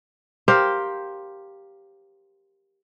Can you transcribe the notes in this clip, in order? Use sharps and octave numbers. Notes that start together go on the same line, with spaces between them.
G4 A#4 C5 F5